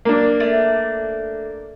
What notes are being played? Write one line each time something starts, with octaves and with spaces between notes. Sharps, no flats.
A#3 D4
A3